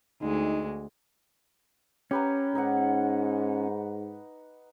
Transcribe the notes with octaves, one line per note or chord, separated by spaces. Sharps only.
D2 G#3 D#4
C#4 G4 B4 A#5
G#2 D#4 B4 F#5